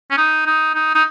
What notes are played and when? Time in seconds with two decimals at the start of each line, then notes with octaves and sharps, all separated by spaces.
0.11 C#4
0.18 D#4
0.46 D#4
0.74 D#4
0.95 D#4